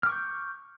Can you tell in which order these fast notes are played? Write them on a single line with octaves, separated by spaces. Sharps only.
F6 D6 C#6 G6